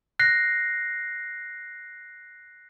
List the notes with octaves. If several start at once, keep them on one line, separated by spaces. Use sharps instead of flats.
F#6 A#6 C7